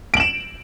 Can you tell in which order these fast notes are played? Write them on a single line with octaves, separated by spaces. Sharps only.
D7 F#7 E7